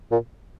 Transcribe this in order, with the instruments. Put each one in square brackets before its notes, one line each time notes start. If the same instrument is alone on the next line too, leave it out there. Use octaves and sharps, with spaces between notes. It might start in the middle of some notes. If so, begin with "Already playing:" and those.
[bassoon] A#2